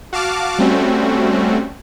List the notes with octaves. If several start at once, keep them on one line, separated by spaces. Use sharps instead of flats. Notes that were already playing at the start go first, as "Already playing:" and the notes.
F#4 F5 A5 D6 F6
G3 A3 C4 C#4 F#4